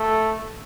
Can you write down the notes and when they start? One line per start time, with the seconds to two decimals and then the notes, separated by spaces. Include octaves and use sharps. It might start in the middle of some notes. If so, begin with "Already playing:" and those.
Already playing: A3